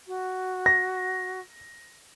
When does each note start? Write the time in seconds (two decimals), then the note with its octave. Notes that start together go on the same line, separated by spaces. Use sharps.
0.07 F#4
0.66 A#6